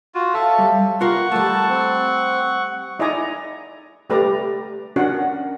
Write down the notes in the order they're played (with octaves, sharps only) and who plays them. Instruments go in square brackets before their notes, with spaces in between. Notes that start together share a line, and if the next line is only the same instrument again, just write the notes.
[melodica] F4 F#4
[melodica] A4 [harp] C#5 E5 F5
[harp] G3
[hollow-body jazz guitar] F4 G4 A#4 [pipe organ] F#5 C#6
[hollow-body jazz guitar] G3 A3 [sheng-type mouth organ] A4 A5
[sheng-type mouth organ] C4
[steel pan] D#4 E4 D5 D#5 G#5 A#5
G3 A3 G4 B4 D5 A#5
C#4 D4 F#4 A#4 F#5